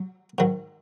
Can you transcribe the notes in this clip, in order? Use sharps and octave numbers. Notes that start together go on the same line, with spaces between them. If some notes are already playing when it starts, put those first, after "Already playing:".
Already playing: F#3
G#2 D#3 F#3